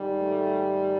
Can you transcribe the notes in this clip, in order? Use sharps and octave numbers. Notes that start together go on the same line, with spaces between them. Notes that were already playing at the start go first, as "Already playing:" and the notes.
Already playing: G#2 D#3 G3
A3